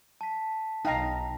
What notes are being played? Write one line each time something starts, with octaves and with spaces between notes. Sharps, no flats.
A5 B6
B1 D#4 F5 G5 A#5